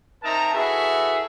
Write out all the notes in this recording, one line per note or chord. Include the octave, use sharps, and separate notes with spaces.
C4 D#4 A#4 E5 A5 A#5
E4 F#4 G#4 A4 B4 E5